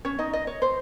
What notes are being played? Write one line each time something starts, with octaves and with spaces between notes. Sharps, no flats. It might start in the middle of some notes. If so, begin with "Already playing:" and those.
C#4 C#5
D#4 D#5
D#5
C#5
C5